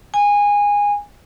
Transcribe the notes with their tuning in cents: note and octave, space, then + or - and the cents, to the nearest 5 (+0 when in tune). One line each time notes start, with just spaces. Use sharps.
G#5 -20